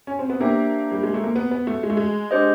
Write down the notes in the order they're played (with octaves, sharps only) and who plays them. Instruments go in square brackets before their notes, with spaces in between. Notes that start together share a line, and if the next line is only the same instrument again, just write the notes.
[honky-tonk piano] C#4
C4
B3
[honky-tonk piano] A#3 [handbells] D4 G4 C5 E5 G5
[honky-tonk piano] G3
G#3
A3
A#3
B3
B3
A3
G#3
A3
G#3
[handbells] D4 G4 C5 D#5